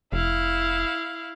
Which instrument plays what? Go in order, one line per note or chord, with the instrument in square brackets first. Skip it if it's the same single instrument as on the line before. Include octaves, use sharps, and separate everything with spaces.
[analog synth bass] F1 [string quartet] E4 F5